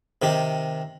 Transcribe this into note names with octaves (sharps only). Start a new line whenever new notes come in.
C3 D#3 G4